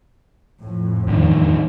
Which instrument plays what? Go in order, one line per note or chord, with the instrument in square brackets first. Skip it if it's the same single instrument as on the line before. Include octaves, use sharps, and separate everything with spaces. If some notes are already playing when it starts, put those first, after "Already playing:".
[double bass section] F2 A2
[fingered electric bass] E2 G2 D#3